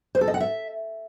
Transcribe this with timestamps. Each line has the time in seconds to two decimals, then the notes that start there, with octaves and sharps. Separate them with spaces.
0.15 C5
0.21 A4
0.28 D#5
0.34 F#5
0.40 E5